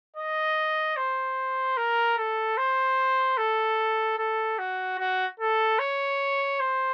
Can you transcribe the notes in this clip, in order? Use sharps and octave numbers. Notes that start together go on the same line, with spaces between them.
D#5
C5
A#4
A4
C5
A4
A4
F#4
F#4
A4
C#5
C5